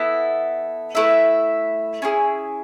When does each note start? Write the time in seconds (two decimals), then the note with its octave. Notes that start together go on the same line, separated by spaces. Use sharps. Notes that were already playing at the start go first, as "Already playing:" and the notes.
Already playing: B3 E4 A4
0.95 A3 E4 B4 E5
2.02 C#4 E4 G#4